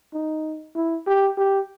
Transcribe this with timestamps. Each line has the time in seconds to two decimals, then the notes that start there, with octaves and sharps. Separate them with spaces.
0.13 D#4
0.75 E4
1.07 G4
1.38 G4